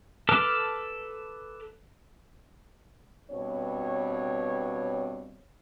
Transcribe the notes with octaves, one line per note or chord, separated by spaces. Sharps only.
A4 B4 A5 D6 F6
G2 B2 C4 C#5